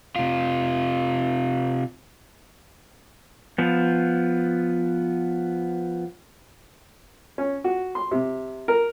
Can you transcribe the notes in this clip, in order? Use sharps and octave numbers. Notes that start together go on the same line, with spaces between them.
C3 F4
F3 B3
C#4
F#4
C6
C3
A#4